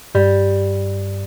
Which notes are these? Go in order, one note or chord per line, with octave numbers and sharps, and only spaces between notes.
G2 G3